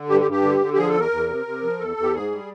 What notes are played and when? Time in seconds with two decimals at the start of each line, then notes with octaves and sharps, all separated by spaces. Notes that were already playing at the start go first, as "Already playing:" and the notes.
Already playing: D3
0.09 G2 G4
0.21 G4
0.25 G2
0.31 G4
0.43 D3
0.60 D3
0.74 G4
0.77 F3 G#4
0.88 A4
0.94 E2
1.00 A#4
1.11 E2
1.28 C3
1.46 C3
1.63 F3
1.80 E2 A4
1.97 E2
2.03 G4
2.13 G#2 G#4
2.31 G3